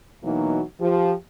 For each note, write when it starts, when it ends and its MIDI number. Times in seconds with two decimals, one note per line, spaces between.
0.24 0.61 47
0.24 0.61 52
0.24 0.61 54
0.24 0.61 58
0.24 0.61 63
0.80 1.13 53
0.80 1.13 67